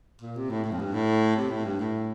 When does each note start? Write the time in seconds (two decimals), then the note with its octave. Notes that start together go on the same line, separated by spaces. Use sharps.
0.21 A#2
0.36 C3
0.49 A2
0.64 A2
0.71 F2
0.79 G2
0.93 A2
1.36 C3
1.50 A2
1.64 G2
1.79 A2